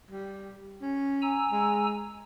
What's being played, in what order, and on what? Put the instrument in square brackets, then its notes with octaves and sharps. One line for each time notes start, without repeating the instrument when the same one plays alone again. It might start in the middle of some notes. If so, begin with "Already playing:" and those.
[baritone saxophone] G3
C#4
[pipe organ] G#5 A#5 E6
[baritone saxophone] G#3